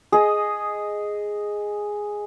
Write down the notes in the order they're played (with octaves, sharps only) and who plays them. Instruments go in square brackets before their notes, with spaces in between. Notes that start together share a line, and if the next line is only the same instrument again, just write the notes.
[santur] G#4 D#5